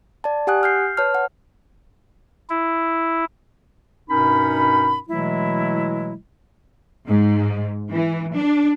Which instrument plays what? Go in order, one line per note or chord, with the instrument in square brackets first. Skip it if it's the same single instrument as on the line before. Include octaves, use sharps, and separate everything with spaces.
[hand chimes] D5 A5
G4 F#5 G#5 D#6 F#6
F6 G6 C7
B4 C#5 A5 F6
F#5
[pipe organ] E4
[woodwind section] G2 B2 C#4 D#4 A#4 B5
B2 E3 F#3 G#3 A3 E4
[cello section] G#2
E3
D4